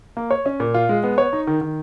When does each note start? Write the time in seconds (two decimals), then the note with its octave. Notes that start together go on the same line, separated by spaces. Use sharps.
0.17 A#3
0.31 C#5
0.46 C#4
0.60 A#2
0.74 F4
0.89 G#3
1.04 B3
1.18 C#5
1.33 D#4
1.47 D#3
1.61 D#3